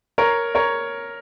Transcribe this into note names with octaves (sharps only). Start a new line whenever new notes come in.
A#4 C#5
A#4 C#5